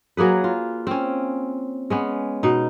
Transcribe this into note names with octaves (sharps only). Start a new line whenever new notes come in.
F#3 A#3 G#4 B4
F4
C4 C#4
G#3 B3 C#4
B2 D#4